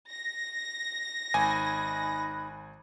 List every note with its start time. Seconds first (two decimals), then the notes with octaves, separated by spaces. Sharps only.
0.11 A#6
1.34 G#1 D#4 G#5 B5 F#6